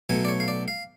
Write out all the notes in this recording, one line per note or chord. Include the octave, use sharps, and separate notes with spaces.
B1 B2 F#3 A3 G#5
D5
C#5
F5
D5
F5